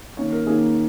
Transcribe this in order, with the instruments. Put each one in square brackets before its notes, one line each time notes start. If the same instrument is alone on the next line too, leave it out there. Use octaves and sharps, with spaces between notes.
[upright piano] D#3 A#3 C#4 C#5
A#4
D#3 A#3 C#4 G#4